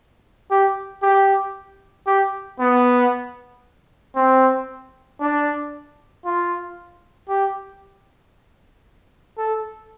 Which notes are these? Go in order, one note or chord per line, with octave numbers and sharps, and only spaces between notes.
G4
G4
G4
B3
C4
D4
F4
G4
A4